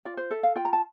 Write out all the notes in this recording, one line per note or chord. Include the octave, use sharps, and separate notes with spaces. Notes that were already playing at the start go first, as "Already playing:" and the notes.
F4 D5
C5
A4 E5
F5
F4 G5
A#5
A5